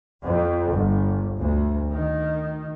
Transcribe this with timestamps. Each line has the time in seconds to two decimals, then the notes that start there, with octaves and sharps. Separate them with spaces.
0.23 F2
0.72 G1
1.38 D2
1.91 D#3